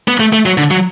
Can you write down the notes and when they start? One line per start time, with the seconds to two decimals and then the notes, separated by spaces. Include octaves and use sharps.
0.08 B3
0.20 A3
0.33 A3
0.46 F#3
0.58 D3
0.71 F#3